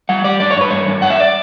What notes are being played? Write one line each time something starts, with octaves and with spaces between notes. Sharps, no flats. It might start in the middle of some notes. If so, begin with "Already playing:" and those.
G3 F#5
G3 D5
G2 D5
C#5
G2 B4
G2 C#5
G2
G2 F#5
E5
D5